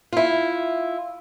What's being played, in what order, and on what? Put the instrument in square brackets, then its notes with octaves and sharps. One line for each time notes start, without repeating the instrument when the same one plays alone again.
[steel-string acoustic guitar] E4 F4